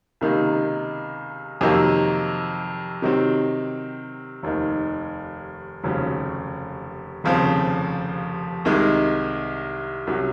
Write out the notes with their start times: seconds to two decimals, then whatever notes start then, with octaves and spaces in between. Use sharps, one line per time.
0.21 C#2 C3 D#3 A#3 D#4
1.61 F2 C3 D#3 F#3 A#3
3.02 C3 D#3 F#3 C4
4.43 F1 D#2 D#3
5.84 F1 D#2 C#3 F#3 C#4
7.24 F1 D#2 C#3 F3 C4
8.65 C2 C3 D#3 G#3
10.07 C2 C3 F#3 C#4